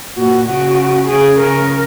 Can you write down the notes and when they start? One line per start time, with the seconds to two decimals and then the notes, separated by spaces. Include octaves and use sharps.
0.17 A#2 F#4
0.48 C#3 F#4
1.08 C#3 G#4
1.39 C#3 A#4